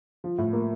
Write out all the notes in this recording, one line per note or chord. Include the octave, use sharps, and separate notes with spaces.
F3
A2
A#3